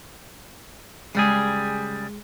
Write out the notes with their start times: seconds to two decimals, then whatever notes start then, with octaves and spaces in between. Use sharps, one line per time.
1.15 C#3 G3 G#3 G#4